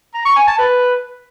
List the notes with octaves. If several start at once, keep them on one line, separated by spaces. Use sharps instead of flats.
A#5
C#6
G#5
A5
B4